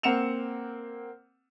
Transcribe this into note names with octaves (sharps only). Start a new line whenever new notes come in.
A#3 C4 F#5 C#7 E7 F7